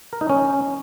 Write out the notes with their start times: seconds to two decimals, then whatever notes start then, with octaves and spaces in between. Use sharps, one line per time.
0.13 A#4
0.21 D#4
0.30 C#4